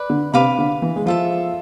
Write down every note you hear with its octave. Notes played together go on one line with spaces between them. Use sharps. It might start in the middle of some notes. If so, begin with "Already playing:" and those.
Already playing: B4 D5
D3
C3 B4 F5 B5 D6
D3
E3
G#3
F3 F4 A4 E5